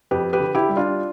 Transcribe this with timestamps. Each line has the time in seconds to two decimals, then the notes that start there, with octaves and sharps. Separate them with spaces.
0.11 F2 G4 B4
0.33 G4 B4
0.40 D3
0.55 E4 G4
0.69 G3
0.77 D4 F4